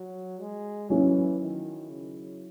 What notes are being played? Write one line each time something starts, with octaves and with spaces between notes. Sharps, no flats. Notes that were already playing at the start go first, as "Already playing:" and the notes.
Already playing: F#3
G#3
E3 F#3 C#4 E4
D#3
C#3